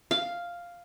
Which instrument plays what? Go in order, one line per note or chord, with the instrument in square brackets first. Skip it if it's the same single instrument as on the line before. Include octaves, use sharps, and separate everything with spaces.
[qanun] F5